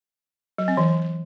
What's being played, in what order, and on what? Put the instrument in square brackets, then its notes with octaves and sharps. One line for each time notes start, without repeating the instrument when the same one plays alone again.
[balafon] F#3
C4
E3